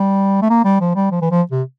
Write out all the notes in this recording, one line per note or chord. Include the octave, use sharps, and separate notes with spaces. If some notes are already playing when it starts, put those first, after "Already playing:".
Already playing: G3
A3
A#3
G3
F3
G3
F3
E3
F3
C3